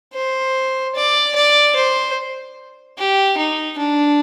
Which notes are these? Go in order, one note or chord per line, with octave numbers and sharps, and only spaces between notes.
C5
D5
D5
C5
G4
D#4
D4